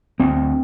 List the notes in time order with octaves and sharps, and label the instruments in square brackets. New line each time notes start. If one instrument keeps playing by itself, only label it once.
[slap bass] D2 C4